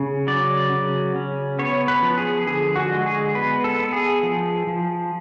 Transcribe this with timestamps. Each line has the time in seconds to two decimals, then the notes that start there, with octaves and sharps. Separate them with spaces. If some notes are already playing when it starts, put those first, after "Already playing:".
Already playing: C#3
0.27 F#3 D5
0.72 C#3
1.16 C#4
1.59 B3 C#5
1.88 B4
2.02 F3
2.18 G#4
2.47 D3 G#4
2.76 F#4
2.91 G#3
3.06 G#4
3.35 B3 B4
3.64 A4
3.79 B3
3.93 G#4
4.23 F3
4.67 F3